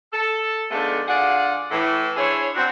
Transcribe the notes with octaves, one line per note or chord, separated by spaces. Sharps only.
A4
D#3 F3 G#3 A3 B3 D4
D3 F4 G#4 D5 F#5
A2 E3
D4 E4 G#4 C5 C#5
F#3 C4 D4 F#4